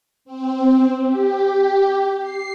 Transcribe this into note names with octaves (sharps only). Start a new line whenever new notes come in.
C4
G4
G4
C7